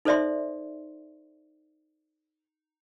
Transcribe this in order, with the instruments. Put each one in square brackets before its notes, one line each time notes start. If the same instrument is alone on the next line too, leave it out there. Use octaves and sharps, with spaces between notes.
[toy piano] D#4 A4 C5 D5 E5 C6